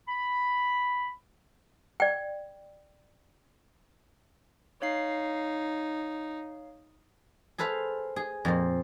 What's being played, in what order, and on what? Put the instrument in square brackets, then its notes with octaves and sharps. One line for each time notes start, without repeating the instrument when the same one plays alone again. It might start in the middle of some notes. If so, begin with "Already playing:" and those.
[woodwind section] B5
[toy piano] D5 G5
[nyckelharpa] D#4 [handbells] C#5 F5 C7
[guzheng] G#4 A4 B4 C5 F5
G#4
F2 A#2 C5